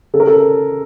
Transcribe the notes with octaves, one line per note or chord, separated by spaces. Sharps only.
C#3 A4
A#4
A4